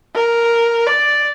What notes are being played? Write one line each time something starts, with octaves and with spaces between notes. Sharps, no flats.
A#4
D5